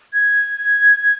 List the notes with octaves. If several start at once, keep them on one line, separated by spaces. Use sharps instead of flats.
G#6